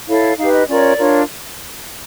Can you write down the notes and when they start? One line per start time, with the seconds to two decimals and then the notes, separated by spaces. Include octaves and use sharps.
0.09 E4 A4 C#5 F5
0.38 D#4 G4 B4 F5
0.53 D#5
0.68 C#4 F4 A#4 C#5 D5
0.99 D4 F4 A#4 C#5